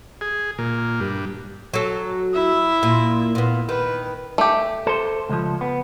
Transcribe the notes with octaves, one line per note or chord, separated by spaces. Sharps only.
G#4
A#2
G2
F#3 A4
E4 E5
A#2
A#2 B3
D#3 B4
A3 G4
A4 C5
C#2 F3
B3